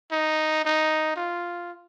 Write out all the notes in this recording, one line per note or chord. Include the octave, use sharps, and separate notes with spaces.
D#4
D#4
F4